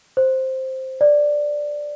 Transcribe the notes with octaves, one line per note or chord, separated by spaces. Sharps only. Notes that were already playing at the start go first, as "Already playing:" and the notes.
C5
D5